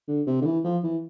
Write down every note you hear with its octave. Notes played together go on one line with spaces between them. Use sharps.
D3
C3
D3
E3
F3
E3